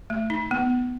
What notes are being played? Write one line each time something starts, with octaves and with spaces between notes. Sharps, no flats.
A3
D#4
B3